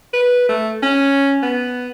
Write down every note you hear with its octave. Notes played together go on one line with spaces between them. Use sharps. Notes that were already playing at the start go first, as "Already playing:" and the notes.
B4
A3
C#4
B3